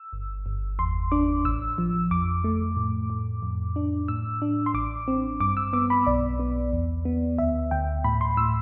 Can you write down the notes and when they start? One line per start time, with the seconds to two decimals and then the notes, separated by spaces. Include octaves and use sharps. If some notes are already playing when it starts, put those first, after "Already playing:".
Already playing: E6
0.13 G1
0.46 G1
0.79 E2 C6
1.12 D4 D6
1.45 A1 E6
1.78 F3
2.11 F2 D6
2.44 A3
2.76 A2
3.10 A2
3.43 F2
3.76 D4
4.08 A2 E6
4.42 D4
4.66 C6
4.74 A1 D6
5.08 C4
5.40 G2 D6
5.57 E6
5.73 B3 D6
5.90 B5
6.07 B1 D5
6.39 B3
6.73 E2
7.05 B3
7.38 D2 E5
7.71 D2 G5
8.04 A2 B5
8.21 C6
8.37 A2 E6